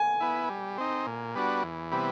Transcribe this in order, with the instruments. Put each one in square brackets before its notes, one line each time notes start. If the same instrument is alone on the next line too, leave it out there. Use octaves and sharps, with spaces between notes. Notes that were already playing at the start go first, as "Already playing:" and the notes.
Already playing: [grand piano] G#5
[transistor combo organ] B3 E4
G3
C4 D#4
A#2
G3 B3 D4 F#4
E2
C3 E3 G3 B3